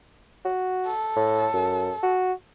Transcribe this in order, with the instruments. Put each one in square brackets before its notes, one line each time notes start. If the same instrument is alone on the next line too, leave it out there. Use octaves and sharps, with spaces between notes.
[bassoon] F#4
[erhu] A4
[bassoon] A2
F#2
F#4